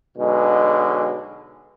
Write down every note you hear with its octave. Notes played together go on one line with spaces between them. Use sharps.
B1 B2 D3 G#3